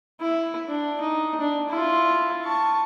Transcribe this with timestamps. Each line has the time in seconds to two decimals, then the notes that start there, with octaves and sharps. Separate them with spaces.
0.21 E4
0.68 D4
1.01 D#4
1.40 D4
1.70 E4 F4
2.45 A5 C#6